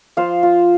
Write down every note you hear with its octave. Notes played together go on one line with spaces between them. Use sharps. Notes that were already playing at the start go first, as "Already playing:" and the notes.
F3 C5 F5
F4